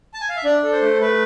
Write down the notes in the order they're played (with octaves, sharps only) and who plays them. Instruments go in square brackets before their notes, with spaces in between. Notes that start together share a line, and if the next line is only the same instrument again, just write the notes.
[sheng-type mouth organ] A5
G#5
F5
E5
D4 D5
A4
C5
A3
A3 B4